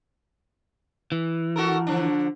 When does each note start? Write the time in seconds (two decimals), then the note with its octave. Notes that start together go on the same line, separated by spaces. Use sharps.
1.12 E3
1.56 F#4 A4 A#4
1.87 D3 F3 D4